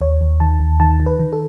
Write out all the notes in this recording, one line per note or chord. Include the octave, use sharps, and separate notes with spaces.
D#2 C#5
D#2
D#3 A5
D#2
D#3 A5
D#3
B4
D#3
A4